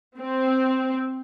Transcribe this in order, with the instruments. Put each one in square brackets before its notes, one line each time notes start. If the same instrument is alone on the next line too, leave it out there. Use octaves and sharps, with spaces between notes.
[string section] C4